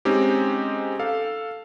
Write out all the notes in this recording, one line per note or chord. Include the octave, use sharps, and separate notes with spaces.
G#3 C4 C#4 D#4 G4
A4 F5